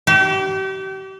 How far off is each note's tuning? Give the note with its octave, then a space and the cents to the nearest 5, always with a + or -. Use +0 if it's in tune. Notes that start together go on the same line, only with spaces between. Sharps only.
G4 -35